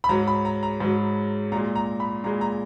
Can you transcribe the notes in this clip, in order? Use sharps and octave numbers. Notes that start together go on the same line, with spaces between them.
B5
G#2 F#3 A#5
B5
A#5
A#5
G#2 F#3
A#2 G#3 A#5
A#5
B5
A#2 G#3 A#5
A#5